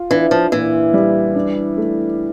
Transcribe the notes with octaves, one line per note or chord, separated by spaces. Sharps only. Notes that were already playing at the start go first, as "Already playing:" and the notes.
Already playing: F4
E3 D4
F3
A#2 E3
G3
D4
A3